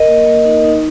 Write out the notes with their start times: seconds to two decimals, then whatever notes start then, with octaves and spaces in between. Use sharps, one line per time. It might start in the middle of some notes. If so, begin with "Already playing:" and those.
Already playing: A#4 D#5
0.08 A#3
0.27 A#3
0.45 D#4
0.64 D#4